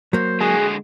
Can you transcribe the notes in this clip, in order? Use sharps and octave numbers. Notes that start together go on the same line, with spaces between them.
F#3 A#3 C5
D3 G#3 F#4 G#4